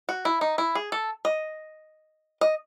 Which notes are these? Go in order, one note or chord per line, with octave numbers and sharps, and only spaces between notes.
F#4
E4
D#4
E4
G#4
A4
D#5
D#5